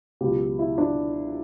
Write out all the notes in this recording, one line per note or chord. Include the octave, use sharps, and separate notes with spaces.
C#2 B2 F#3 G4
E4
D4